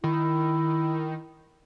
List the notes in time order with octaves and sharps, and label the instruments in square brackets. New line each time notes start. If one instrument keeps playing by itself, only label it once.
[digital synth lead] D#3 [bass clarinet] E4